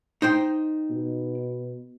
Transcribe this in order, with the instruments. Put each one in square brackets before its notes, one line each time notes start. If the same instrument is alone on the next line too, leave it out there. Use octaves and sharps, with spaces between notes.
[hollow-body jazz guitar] D#4 C5 G5
[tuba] B2